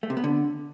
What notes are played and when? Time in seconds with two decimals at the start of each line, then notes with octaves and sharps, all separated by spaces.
0.03 A3
0.10 C3
0.17 B3
0.24 D3